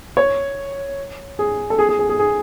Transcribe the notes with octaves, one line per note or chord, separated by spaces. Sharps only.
C#5
G#4
A4
G#4
G#4
G#4
G#4
G#4